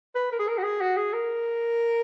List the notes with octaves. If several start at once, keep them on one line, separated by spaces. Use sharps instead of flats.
B4
A#4
G#4
A#4
F#4
G#4
F#4
G#4
A#4